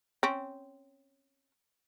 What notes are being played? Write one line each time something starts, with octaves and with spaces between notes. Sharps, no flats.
C4 C#4